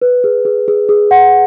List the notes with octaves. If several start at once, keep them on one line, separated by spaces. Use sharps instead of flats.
B4
G#4
G#4
G#4
G#4
F#5